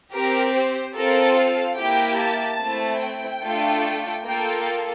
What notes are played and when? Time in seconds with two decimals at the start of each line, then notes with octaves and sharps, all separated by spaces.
0.12 C4 G4 A#4
0.53 C5
0.95 C4 F4 A4 A#4
1.36 F5
1.77 A#3 E4 G4 G5
2.19 A5
2.60 A3 C4 E4
3.01 G5
3.43 A3 D4 F4 A4
4.24 A#3 F4 A4 G5